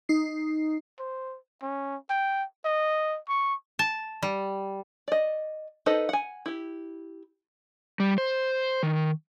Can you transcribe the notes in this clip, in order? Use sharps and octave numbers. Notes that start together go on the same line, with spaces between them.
D#4 C7
C5
C#4
G5
D#5
C#6
A5
G3
D5 D#5
D#4 A4 B4 C5 D#5
F#5 G#5
E4 G4
G3
C5
D#3